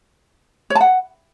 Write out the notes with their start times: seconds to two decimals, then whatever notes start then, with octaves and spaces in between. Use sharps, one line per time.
0.70 C#5
0.75 A5
0.81 F#5